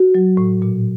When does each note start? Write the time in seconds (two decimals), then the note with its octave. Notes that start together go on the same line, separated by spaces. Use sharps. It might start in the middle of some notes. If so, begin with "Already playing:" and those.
Already playing: F#4
0.15 F#3
0.37 A2
0.62 A#2